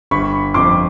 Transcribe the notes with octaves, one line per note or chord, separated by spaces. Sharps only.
G1 B5 C#6
F2 C6 D6